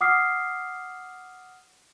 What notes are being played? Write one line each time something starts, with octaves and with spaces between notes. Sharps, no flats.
F#5 D6 D#6 F6 C7